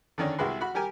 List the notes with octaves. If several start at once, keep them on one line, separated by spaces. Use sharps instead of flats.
D3 D#3 C#4 D4
C2 G#3 E4 F#4 B4 C6
F#4 B5
G3 G4 A#4 G#5